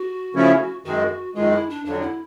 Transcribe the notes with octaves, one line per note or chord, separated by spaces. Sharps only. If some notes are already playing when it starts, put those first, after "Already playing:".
Already playing: F#4
C#3 F3 A3 C#4 E4
F#2 D#3 G#3 F#4
F#2 D#3 G#3 F4
E4
D4
F2 D3 F#3 D4
E4